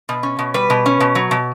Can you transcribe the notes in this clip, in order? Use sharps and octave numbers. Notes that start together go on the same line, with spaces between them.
B2
C#4
B2
G3 B4
B2
C#4
B2
F#3
B2